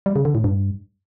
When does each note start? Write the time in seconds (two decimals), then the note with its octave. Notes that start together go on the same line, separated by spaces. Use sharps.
0.06 G3
0.16 C#3
0.25 D3
0.35 A2
0.44 G2